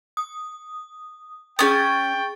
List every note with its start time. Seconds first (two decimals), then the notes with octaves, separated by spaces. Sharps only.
0.17 D#6
1.59 C#4 G#4 G5 C#6 D#6 A6